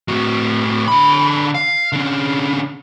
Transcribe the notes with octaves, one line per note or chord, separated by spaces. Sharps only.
A2 F#4
D3 B5
F5
D3 C#4